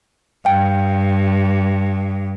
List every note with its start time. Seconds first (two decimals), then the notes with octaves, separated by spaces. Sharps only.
0.45 G2 F5 G5